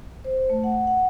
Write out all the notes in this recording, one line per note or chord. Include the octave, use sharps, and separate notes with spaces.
C5
A3
F#5
F#5